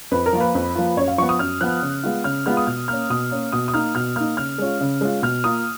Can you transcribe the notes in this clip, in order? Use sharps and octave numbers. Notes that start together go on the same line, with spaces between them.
F2 B4
A#4
F3 A#3 F4
B4
F2
F3 A#3 F4
F#2 C#5
F5
F3 B3 C#6
D#6
F#2 F6
F3 B3 F#6
C#3
G#3 B3 F4
C#3 F6
G#3 B3 F4 F6
D#6
B2 F6
A#3 C#4 F6
B2 D#6
A#3 C#4
B2 D#6
D#6
A#3 D#4 F6
B2 F6
A#3 D#4 F6
C#3 F6
G#3 C#4 F4
C#3
G#3 C#4 F4
B2 F6
A#3 F4 D#6